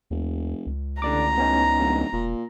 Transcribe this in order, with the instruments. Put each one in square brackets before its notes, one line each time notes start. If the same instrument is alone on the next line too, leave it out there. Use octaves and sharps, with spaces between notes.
[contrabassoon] F1 [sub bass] D#2
[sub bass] C#2
[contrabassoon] A1 [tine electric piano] D3 D5 D6 [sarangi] A#5
[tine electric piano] B3 C#4 D#4
[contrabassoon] D1
[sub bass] E1 [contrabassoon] A#2